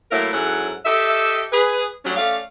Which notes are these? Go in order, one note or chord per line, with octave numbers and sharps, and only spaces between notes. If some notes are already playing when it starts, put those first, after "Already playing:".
A2 F#3 A3 A#3 E4 A#4
G#2 F#3 C#4 E4 A4 F#5
G4 A4 D#5 E5
G#4 B4
F#3 G3 A3 C#4 D4
A3 C#4 D5 F5